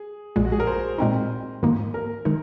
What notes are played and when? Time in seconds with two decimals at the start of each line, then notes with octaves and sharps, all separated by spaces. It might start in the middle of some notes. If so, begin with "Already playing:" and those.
Already playing: G#4
0.36 A#1 A#2 G#3
0.45 F#4
0.52 G#4
0.60 A#4
0.67 C5
0.98 A#2 G#3 C4 D#4
1.63 G#2 D#3 A#3 D#4
1.94 A#4
2.25 D#3 G#3 D#4